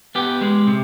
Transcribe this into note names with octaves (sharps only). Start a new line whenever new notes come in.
B3 G4
G#3
C3